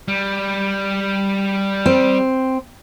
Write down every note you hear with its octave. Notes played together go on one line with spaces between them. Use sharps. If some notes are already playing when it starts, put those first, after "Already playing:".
G3
C4